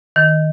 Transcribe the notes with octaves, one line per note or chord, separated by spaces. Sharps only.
D#3